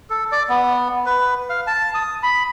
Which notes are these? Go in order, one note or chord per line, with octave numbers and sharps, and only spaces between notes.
A4
D5
B3
B4
F5
A5
D#6
B5